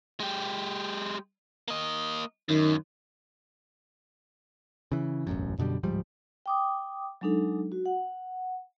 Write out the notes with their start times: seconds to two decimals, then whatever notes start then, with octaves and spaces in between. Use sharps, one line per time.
0.20 G#3 G4
1.68 A#3 D#5
2.49 F#2 D#3
4.92 C#3 E3
5.27 E1 A1 F#2
5.58 F#2 B2 D3 G3
5.83 D1 G#2 F3 G3
6.46 G5 D6 D#6
7.21 F#3 G#3 D4 D#4 A4
7.72 F#4
7.86 F#5